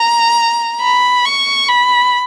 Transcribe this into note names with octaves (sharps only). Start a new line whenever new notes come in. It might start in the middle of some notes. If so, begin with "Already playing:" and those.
Already playing: A#5
B5
C#6
B5